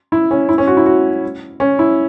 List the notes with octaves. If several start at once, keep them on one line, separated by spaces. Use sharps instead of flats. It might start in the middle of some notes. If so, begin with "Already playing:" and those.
E4
C#4
E4
C#4
F#4
E4
F#4
C#4
E4